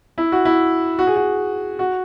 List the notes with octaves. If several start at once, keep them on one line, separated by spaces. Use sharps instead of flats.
E4
F#4
E4
F#4
G#4
F#4
F#4